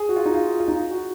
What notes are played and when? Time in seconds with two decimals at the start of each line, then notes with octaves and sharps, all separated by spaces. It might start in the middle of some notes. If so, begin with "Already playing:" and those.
Already playing: G#4
0.09 F#4
0.16 F4
0.26 D#4
0.34 F4
0.60 F4
0.68 D#4
0.91 F#4